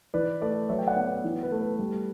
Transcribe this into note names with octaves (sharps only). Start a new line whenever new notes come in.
E3 B4 D5
A3 B4 D5
F#3 C#5 E5
G5
D5 F#5
B3
B4
E3
B4
A3
B4
G3